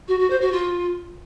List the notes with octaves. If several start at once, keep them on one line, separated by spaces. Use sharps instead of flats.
F#4
F#4
C5
F#4
F4